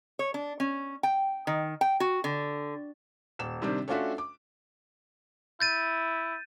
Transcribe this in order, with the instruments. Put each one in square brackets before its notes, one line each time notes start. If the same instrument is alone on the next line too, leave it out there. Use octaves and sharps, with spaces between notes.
[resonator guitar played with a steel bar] C#5
D4
C#4
G5
D#3
G5
F#4
D3
[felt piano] D#1 E7
C3 D#3 G3 C4 D4
A3 C#4 D4 F4 F#4 E5
D6
[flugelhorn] E4 [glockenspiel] G6 A6 D#7